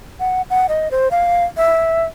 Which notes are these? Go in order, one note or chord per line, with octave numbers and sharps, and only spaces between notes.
F#5
F#5
D#5
C5
F5
E5